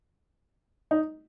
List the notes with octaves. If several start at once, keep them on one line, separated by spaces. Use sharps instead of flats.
D#4